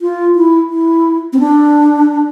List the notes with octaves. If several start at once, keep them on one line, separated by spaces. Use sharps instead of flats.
F4
E4
E4
C4
D4